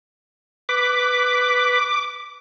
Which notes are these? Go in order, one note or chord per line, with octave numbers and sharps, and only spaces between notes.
B4 D6